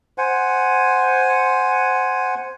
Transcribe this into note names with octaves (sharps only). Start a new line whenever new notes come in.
C5 F#5 G#5